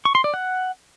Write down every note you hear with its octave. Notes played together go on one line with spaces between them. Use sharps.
C#6
C6
D5
F#5